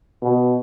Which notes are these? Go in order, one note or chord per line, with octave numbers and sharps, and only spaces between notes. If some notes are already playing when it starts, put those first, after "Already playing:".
B2